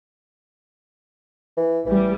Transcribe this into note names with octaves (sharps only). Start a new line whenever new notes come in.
E3
A1 E3 G3